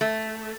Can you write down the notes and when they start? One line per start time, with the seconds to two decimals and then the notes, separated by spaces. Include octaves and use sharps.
0.01 A3